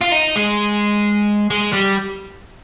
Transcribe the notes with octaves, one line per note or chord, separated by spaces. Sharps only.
F4
D#4
G#3
G#3
G3